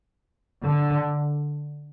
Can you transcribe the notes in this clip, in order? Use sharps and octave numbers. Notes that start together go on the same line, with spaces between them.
D3